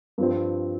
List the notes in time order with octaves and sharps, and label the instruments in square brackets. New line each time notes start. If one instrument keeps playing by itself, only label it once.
[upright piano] G2 F3 C4